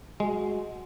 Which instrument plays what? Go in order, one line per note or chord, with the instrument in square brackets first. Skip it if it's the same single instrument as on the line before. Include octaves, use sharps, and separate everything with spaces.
[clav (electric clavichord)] G#3 [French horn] F#4